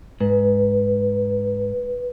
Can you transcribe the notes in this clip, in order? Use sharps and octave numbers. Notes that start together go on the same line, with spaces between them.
G#2 B4